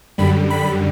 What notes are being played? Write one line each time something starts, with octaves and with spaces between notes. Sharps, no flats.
F#2 D3 G3 B5
B5